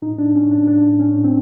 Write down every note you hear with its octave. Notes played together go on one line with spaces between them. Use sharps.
A2 D#4
D4
A2
C#4
A2
D4
A2 D4
A2
C#4
A2
C4